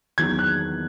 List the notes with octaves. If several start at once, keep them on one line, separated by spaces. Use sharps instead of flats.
E2 D#3 F#3 G#6
F#6